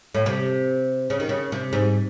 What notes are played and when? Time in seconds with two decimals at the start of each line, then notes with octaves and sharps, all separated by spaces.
0.15 A2
0.26 C3
1.10 C#3
1.20 D#3
1.29 C#3
1.52 C3
1.73 G#2